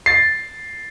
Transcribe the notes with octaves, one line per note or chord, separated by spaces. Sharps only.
A6 C7